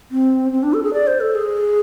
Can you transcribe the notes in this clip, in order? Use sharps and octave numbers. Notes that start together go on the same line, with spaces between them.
C4
C4
D4
A4
G#4
D5
C5
A4
G#4